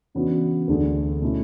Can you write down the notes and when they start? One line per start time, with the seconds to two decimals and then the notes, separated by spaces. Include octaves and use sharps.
0.15 C#3 E3 B3 D4 F#4
0.68 D2 D3 A3 D4 G#4
1.21 B2 A3 C#4 E4